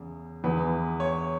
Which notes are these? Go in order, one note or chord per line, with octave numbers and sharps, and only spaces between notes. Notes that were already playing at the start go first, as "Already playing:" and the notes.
Already playing: E2 C#3
E2 E3 B4
C#5